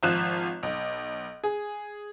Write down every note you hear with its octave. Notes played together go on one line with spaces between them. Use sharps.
G#1 F3 F4 F#6 E7
B1
G#4